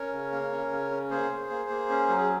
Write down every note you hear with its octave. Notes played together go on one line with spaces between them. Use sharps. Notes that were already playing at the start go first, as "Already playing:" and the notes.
Already playing: C#4 A#4 C#5
C#3
A#3
C#4
C#3
C#4
A#3 G#4 C5
A#3
A#3
A#3
C#4
F#3
G#4